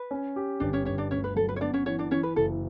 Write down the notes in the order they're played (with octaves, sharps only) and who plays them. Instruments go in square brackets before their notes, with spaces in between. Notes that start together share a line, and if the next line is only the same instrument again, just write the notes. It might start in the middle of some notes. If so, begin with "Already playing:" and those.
Already playing: [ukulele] B4
[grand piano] C#4
G4
[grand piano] G1 [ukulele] D4 D5
[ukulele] C#4 C#5
[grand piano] G1 [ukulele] C#4 C#5
[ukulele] D4 D5
[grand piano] D2 [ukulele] C#4 C#5
[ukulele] B4
[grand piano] F#3 [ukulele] A4
[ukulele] B4
C#5
[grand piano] B3 [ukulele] D4 D5
[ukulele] C#4 C#5
[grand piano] E3 [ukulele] C#4 C#5
[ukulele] D4 D5
[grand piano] E3 [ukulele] C#4 C#5
[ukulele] B4
[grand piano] F#1 [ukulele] A4